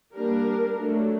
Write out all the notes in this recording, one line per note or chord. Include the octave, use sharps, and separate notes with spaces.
G3 A#3 D4 A#4
F#3 A3 D4